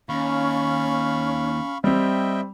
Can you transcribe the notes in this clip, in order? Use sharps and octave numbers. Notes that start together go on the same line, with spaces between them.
D#2 C#4 F5 B5 C#6
G3 C4 D#5 E5 G5